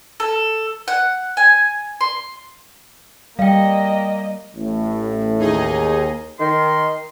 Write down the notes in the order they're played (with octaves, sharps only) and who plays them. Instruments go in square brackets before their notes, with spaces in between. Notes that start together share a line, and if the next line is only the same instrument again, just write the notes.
[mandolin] A4
F#5
G#5
C6
[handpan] G3 [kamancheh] A#3 D#5 [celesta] F5 G5
[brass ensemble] A1 A2
[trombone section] D#2 [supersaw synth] D#4 G#4 D#5
[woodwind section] D#3 C6